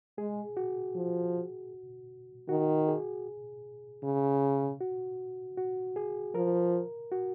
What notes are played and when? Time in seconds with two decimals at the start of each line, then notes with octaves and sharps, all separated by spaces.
0.18 G#3 G#4
0.57 F#4
0.95 F3
2.49 D#3 F#4
2.88 G#4
4.04 C#3
4.81 F#4
5.57 F#4
5.96 G#4
6.34 F3 A#4
7.12 F#4